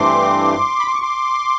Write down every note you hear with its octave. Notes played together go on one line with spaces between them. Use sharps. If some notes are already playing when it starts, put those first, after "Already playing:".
Already playing: G2 E3 A3 C4 C6 D6
B5
C6
C#6
C6 D6